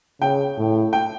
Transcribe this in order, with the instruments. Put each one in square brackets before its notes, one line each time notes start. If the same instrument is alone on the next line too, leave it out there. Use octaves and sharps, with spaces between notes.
[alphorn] C#3 [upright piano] G5
[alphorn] A2
[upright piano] G5